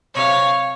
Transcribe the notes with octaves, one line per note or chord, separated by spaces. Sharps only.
C3 F#3 C#5 F5